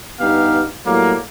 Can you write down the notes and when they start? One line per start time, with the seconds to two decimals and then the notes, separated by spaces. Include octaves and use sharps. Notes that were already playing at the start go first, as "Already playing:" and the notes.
0.20 G2 B3 D#4 G4 F5
0.85 A2 F#3 G3 A#3